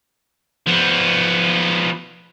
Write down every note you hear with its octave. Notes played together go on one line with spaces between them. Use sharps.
F3 B3